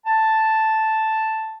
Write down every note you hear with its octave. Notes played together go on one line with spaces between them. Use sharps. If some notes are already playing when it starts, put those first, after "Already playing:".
A5